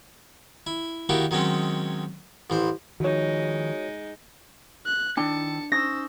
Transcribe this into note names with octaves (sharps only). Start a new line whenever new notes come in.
E4
D#3 A#3 E4 F#4 G4
D#3 F#3 G#3 C4 C#4
A1 E3 C5
D#3 F3 G#3 D#4 F#4 C#5
F#6
D#3 D4 E4 G5 A5 C#7
C#4 D#4 C5 E6 A#6